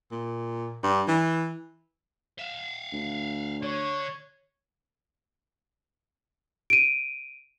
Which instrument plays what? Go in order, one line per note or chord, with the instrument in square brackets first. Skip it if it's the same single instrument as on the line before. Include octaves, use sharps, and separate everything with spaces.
[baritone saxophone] A#2
G2
E3
[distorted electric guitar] E5 F5
[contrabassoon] D2
[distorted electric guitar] D3 [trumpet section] C#5
[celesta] D7 D#7